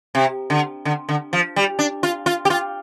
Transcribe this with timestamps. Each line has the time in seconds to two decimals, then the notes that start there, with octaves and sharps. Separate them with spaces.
0.15 C3
0.50 D3
0.85 D3
1.09 D3
1.33 F3
1.56 G3
1.79 D4
2.03 F4
2.26 F4
2.45 G4
2.50 F4